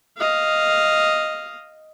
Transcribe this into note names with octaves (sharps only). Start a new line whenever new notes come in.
D#5 F5